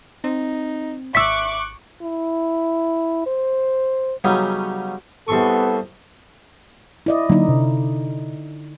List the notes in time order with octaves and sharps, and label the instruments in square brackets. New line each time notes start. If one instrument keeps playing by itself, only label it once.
[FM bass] C4 [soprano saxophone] D#4
[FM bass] G#1 [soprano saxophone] E5 [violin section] C#6 D6 F#6 [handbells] E6 B6
[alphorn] E4
C5
[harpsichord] C#3 F#3 G3 B3 C#4 D#4
[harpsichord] C2 C6 C#6 [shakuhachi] B3 [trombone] A4
[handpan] E4 D5 D#5
[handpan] D3 D#4 [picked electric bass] F#3 A#3
[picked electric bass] C3